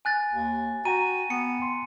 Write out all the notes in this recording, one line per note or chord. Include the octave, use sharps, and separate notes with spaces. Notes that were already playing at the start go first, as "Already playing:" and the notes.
G#5 F#6 A6
D#2
F#4 G5 A#5 D#7
B3 C#7
C6